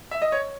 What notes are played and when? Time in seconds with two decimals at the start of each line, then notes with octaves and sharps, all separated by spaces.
0.11 E5
0.22 D#5
0.32 C#5